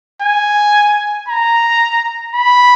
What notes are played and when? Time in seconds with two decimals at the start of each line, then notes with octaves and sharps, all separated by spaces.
0.22 G#5
1.29 A#5
2.35 B5